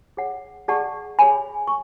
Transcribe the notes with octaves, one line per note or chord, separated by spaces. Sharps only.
G#4 C#5 F#5
G#4 D5 F#5 A5 C#6
G#4 C#5 G#5 B5
C#6